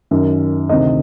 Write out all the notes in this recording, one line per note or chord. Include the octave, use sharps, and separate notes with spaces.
F#2 D#3
D2 C3 D#3 D#5